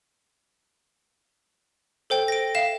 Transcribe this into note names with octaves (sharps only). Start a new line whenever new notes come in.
A4 C5 G5
A#6 D7
E5 F5 E7